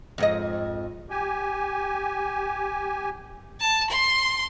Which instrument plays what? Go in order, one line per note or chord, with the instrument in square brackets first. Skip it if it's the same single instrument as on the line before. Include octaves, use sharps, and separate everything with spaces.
[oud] F2 G#2 D#5
[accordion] G4 G#5
[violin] A5
C6